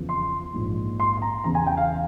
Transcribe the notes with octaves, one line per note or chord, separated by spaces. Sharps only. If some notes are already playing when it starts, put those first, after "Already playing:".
Already playing: E2 C#3 F3
C6
A#1 G#2 F3
C6
C6
A#5
E2 C#3 E3 A#5
G#5
G5
F5